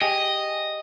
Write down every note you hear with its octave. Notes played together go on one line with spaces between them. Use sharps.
G4 G#4 D#5